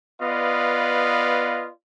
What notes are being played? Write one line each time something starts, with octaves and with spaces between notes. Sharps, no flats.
B3 F4 B4 D5 D#5 F5